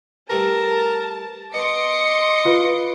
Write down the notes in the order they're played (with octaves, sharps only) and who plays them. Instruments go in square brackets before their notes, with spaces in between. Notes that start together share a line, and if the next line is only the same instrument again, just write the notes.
[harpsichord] E3 G3 A3 [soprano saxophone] A#4 [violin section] A5
[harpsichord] B3 [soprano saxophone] D#5 [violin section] C6 D6 C#7
[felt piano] F4 B4